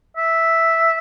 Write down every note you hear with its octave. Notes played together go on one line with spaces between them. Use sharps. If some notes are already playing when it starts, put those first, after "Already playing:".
E5